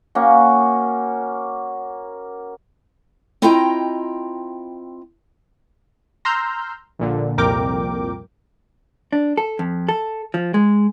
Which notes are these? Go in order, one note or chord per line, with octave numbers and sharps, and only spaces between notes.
A#3 C#4 F#4
C4 E4 F4 D#5 G5 A#5
A#5 C6 E6 F6 G6
A#1 A#2 D3
C2 F2 A#2 A#4 G5 D6
D4
A4
F2
A4
F3
G#3